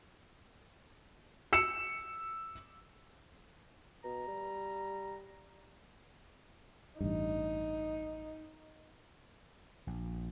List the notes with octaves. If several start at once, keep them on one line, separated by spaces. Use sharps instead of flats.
E6 C#7 E7
B2 A#5
G3
A1 G2 D#4
A#1